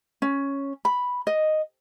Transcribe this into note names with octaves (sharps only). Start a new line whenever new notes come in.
C#4
B5
D#5